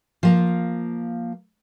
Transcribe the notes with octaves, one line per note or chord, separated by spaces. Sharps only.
F3 A#3